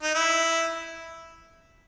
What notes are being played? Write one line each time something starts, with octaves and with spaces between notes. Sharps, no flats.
D#4
E4